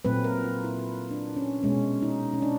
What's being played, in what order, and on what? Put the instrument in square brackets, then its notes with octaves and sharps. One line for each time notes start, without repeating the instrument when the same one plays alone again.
[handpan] A#2 F#3 A3 C4 B4
A#4
F4
E4
D4
C#4
B2 G#3 C#4
D#4
C#4
D4